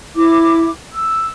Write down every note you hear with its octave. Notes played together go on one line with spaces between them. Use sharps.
E4 D6
E6